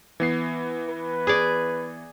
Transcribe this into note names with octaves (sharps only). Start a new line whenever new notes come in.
E3 B3 C7
B4
G#4 D5